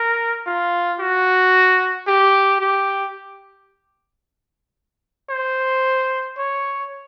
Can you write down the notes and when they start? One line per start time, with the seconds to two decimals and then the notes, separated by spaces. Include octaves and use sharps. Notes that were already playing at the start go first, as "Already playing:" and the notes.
Already playing: A#4
0.47 F4
1.00 F#4
2.07 G4
2.61 G4
5.30 C5
6.38 C#5